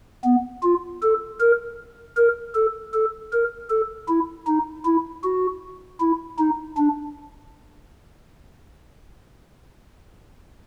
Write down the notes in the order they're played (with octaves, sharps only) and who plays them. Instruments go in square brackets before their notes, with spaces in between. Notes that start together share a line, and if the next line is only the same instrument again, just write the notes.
[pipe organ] B3
F4
A4
A#4
A#4
A4
A4
A#4
A4
E4
D#4
E4
F#4
E4
D#4
D4